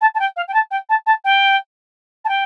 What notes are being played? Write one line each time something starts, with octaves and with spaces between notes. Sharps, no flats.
A5
A5
G5
F5
G5
A5
G5
A5
A5
G5
A5
G5